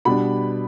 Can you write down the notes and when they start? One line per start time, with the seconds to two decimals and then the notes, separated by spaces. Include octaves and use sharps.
0.05 B2 G3 D4 B5